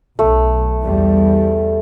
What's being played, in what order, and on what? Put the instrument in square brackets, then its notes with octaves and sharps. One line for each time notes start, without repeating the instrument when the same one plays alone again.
[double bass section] B1 [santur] A3
[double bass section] E2 G3